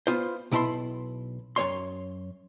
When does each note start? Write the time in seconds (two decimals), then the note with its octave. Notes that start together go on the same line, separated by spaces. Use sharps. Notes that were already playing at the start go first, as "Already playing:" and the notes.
0.07 B3 F4 C5
0.52 B1 B2 E4 A5 B5 C6
1.56 F#2 F3 C#5 C6